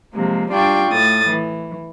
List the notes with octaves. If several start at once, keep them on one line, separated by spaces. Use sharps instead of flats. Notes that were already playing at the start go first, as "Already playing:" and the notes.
C3 F3 G#3 A#3
G3 D4 F4 D5 G5 C#6
A2 A3 D#6 A6
E3